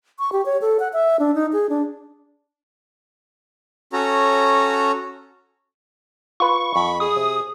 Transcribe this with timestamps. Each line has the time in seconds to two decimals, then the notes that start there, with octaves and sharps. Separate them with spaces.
0.19 C#6
0.32 G4
0.46 C#5
0.62 A4
0.80 F#5
0.93 E5
1.20 D4
1.35 D#4
1.53 G#4
1.69 D4
3.93 C#4 F#4 A4 C#5 A#5
6.40 F4 B4 C#6
6.76 F2 B5
7.00 G#4 D#6
7.16 C3